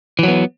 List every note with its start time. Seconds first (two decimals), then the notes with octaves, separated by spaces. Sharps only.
0.19 E3
0.23 F#3
0.28 B3